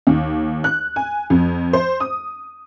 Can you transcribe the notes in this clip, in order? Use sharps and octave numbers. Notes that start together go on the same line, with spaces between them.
D#2
F#6
G#5
F2
C5
D#6